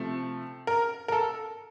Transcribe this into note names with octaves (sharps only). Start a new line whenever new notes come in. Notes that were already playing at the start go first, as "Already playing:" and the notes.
Already playing: C3 F3 A3
A#4
A#4
A4